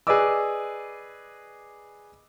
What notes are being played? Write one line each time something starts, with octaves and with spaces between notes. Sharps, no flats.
G#4 B4 D5 D#5 D6 E6